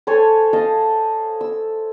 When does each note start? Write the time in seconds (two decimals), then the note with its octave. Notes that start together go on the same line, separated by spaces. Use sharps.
0.07 A4 C5 C#5 G#5
0.53 D#5 F5 A5
1.41 E6